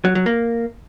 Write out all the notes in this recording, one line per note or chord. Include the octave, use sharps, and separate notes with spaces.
F#3
F#3
A#3